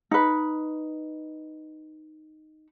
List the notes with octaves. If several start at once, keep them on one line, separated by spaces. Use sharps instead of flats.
D#4 B4